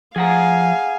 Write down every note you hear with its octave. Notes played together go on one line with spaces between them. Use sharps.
F3 G#4 F5 F#5 G#5 A#5